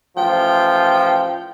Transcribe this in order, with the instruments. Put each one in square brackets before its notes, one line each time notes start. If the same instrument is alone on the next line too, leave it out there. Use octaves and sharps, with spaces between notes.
[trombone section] A1 F3 [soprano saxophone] G5